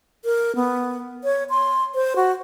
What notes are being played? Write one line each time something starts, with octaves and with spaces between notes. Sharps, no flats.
A#4
B3
C#5
C6
C5
F#4